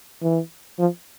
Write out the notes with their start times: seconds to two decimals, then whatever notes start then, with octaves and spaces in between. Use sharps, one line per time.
0.23 E3
0.79 F3